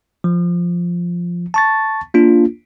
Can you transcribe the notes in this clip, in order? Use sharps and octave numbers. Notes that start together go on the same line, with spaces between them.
F3
A5 C#6 A6
A#3 D4 F4